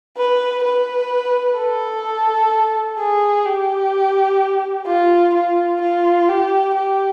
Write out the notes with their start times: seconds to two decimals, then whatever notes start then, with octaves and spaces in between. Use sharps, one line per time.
0.18 B4
0.64 B4
1.58 A4
2.99 G#4
3.46 G4
4.87 F4
5.34 F4
5.81 F4
6.28 G4
6.75 G4